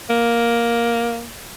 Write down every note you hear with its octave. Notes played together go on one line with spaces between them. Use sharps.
A#3